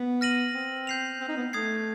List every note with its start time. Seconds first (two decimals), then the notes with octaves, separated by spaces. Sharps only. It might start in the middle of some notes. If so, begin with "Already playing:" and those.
Already playing: B3
0.21 F6 A#6 D#7 F#7
0.54 C4
0.87 G6 C7 F7
1.21 C4
1.28 D#4
1.37 B3
1.53 A3 D#6 G#6 C7